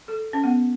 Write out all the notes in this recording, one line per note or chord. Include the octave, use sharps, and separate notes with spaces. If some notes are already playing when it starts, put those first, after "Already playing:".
A4
C#4
B3